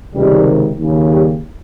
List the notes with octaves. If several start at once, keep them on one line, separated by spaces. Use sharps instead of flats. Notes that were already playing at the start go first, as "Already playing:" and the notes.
C#2 C3 D#3 G3
D#2 C#3
G3